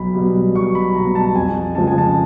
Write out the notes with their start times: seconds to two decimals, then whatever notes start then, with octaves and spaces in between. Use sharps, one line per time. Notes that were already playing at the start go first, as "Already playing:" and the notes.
Already playing: B1 B5
0.14 B2 G3
0.55 B1 C#6
0.75 B5
0.95 B2 G3 A#5
1.15 A5
1.35 F2 G#5
1.75 C#3 F3 G#3 A5
1.87 G#5
1.98 A5